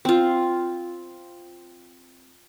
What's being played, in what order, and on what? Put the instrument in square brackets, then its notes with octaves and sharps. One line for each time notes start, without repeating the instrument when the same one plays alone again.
[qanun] C4 F4